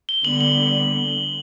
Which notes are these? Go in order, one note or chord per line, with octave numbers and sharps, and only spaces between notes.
G7
D3 G3 B3 F#7
F#7